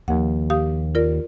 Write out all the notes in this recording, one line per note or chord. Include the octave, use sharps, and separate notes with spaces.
D#2 F3 F#5
G4 F5 D#6
F4 A#4 D5